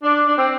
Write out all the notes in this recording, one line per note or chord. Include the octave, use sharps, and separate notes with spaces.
D4
D4
C4